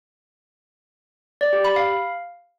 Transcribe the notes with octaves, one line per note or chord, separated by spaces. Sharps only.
D5
G4
B5
F5